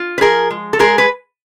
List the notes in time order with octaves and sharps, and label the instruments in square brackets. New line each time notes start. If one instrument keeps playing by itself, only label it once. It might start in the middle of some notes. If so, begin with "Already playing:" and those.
Already playing: [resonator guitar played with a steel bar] F4
B4
F3 G#4 A#4
G#3
A4
G#3 G#4 A#4
B4